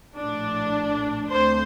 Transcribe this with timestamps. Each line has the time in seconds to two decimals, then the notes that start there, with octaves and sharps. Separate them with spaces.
0.17 A#1 A2 A3 D4
1.31 D2 D3 A3 C4 C5